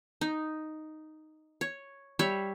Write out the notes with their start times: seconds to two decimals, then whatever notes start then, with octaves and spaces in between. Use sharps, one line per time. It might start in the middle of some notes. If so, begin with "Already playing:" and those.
0.21 D#4
1.61 C#5
2.19 G3 C#5 E5